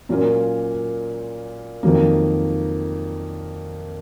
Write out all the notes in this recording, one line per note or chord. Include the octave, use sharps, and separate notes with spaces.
A#2 F#3 C#4 F4 A#4
F2 D#3 F#3 A#3